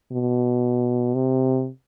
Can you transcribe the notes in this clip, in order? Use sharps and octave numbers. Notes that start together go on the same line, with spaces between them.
B2
C3